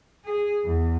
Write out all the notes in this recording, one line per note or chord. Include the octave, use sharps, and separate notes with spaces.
G#4
E2